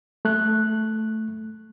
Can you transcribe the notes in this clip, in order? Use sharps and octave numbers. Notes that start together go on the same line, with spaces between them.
A3 F#6